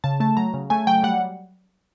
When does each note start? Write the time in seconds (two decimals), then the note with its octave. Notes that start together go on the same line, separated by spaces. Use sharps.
0.04 C#3 A5
0.20 A3 A5
0.37 F#3 A#5
0.54 C#3
0.70 A3 G#5
0.87 F#3 G5
1.03 G3 F#5